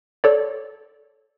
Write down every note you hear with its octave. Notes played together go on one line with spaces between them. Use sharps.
A4 C#5 D5